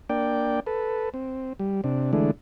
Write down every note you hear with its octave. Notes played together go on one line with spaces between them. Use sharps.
A#3 D4 D5 G5
A4 B4
C4
G3
C3 D4
D3 E3 G#3 A3 D4